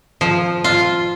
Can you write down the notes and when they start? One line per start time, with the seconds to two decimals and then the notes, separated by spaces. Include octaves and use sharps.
0.21 F3
0.64 F4